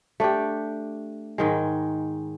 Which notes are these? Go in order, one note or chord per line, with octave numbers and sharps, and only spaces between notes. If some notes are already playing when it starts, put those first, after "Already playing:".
A3 D4 G4
G#2 D#3 G#3